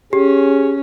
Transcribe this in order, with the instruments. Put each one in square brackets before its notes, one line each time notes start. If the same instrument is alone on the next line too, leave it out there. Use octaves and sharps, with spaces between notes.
[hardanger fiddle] C#4 [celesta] G4 [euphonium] G#4